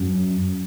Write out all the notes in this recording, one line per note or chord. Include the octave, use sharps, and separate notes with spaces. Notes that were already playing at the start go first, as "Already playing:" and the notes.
Already playing: F#2